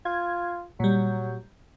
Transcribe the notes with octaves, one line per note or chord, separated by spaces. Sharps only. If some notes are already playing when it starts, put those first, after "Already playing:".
F4 G#6
A#2 F#3 G3